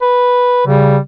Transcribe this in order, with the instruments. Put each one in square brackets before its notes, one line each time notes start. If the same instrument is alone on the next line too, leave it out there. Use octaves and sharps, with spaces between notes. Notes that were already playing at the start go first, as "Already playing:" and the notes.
[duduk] B4
[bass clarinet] C#3 [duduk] G3